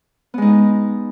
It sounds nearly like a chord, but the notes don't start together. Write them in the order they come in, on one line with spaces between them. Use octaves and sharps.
B3 G#3 D#4